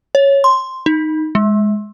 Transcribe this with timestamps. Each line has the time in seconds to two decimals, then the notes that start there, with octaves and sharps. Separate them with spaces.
0.15 C#5
0.44 C6
0.86 D#4
1.35 G#3